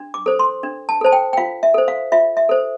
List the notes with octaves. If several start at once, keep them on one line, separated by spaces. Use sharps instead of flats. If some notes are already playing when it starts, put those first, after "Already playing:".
Already playing: D4
D6
A4 C5
C6
D4
A5
A4 C5 A5
G5
G5
F4 F5
E5
A4 C5
F5
F4 E5
E5
A4 C5